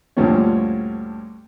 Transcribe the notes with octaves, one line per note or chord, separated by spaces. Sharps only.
D2 G2 A#2 F3 C#4